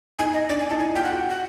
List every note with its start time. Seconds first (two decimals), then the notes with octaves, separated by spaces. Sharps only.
0.19 D#4 G#5
0.34 D#5
0.49 D4 D5
0.59 G#5
0.70 D#4 A5
0.79 E4 G#5
0.95 F4 G5
1.04 F#5
1.11 F#4 G5
1.29 F#5